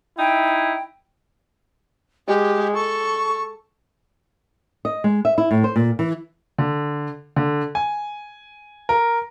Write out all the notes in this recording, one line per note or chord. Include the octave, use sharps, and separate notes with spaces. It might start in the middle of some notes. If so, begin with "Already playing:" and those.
D#4 E4 G5
G#3 G4
A4 C#6
D#5
G#3
E5
E4
A2
C5
A#2
E3
D3
D3
G#5
A#4